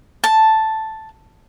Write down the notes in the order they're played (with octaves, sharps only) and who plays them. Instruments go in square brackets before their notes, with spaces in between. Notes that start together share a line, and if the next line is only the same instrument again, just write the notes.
[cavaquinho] A5